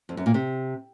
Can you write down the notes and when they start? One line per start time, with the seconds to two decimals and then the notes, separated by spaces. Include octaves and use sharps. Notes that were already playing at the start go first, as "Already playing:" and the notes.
0.09 F2
0.17 F#2
0.26 A#2
0.34 C3